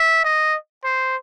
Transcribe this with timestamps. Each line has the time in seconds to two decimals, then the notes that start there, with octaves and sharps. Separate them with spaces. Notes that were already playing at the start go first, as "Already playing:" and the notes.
Already playing: E5
0.24 D#5
0.84 C5